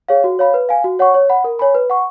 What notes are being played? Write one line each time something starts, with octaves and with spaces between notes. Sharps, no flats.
G#4 C#5 F5
F#4
C#5 F5 B5
B4
F5 G#5
F#4
C#5 F#5 C#6
C#5
F#5 B5
A#4
C#5 G#5 B5
B4
F#5 C#6